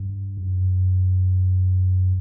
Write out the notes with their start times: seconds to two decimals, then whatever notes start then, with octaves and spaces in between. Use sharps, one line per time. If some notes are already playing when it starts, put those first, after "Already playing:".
Already playing: G2
0.37 F#2